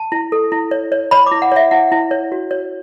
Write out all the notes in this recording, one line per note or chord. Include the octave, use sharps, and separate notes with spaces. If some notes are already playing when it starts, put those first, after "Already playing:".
Already playing: A5
E4
A4
E4
C#5
C#5
C#5 B5
D6
E4
F#5
C#5 E5
E4 F#5
E4
C#5
F#4
C#5